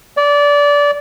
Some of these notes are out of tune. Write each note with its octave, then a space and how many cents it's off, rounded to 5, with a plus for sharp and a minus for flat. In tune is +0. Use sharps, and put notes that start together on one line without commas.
D5 -20